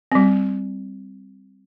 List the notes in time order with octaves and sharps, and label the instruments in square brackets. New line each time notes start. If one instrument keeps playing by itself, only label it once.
[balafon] G3 C4